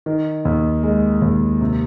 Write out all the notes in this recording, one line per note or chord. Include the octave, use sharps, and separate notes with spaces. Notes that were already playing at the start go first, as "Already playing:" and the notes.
D#3
D#2
G#3
D#2
C3